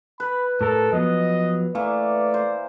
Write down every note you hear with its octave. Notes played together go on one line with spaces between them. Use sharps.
B4 B5
A2 A4 A#4
F3 F#3 B3 D#5
E3 A3 A#3 D5
C5